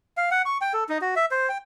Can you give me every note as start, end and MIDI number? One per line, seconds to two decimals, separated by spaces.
0.17 0.30 77
0.31 0.42 78
0.46 0.58 85
0.61 0.73 79
0.73 0.84 69
0.89 0.98 63
1.01 1.15 66
1.16 1.26 76
1.31 1.49 72
1.49 1.58 79